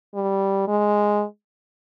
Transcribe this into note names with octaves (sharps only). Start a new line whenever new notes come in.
G3
G#3